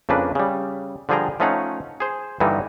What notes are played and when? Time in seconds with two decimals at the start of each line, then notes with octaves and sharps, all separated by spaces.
0.09 F2 C#3 A#3 D4 B4
0.35 C#3 G3
1.09 D3 F3 G3 G#4 G5 A#5
1.40 F3 A3 C#4 D#4 F5 F#5
2.00 G#4 C5
2.40 G2 D3 E3 G3 A#3 D#4